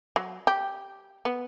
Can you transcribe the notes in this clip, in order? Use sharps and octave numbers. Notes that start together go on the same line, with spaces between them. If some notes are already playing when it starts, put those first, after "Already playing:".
F#3
G4
B3